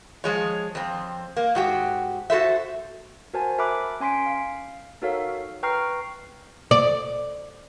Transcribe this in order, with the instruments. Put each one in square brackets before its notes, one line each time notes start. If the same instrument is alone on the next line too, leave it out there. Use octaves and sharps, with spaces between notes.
[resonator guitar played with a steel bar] F3 G#3 C#5
F2 C4
A#3
G#2 F#4 G4
F#4 A4 C5 E5
[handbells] F#4 A#4 C5 G#5 A5
A#4 E5 A5 B5 D6 F#6
C#4 G#5 C6 B6 D7
F5
D#4 F#4 A4 A#4 C#5 F5
B4 G5 A#5 C#6 F6 C7
[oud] D5